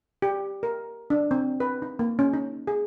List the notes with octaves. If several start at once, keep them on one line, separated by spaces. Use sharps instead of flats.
G4
A#4
D4
C4
B4
D#4
A#3
C#4
D#4
G#4